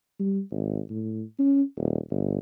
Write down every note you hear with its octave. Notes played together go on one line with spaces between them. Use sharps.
G3
G#1
A2
C#4
D#1
G1